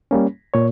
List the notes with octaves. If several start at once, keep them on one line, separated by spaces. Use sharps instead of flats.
G3 A#3 C#4
A#2 C#5